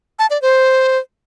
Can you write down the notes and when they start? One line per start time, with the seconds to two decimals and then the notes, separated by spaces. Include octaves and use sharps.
0.19 A5
0.30 D5
0.42 C5